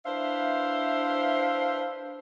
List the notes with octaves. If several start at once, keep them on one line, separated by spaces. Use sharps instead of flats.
D4 E4 B4 C5 E5 F5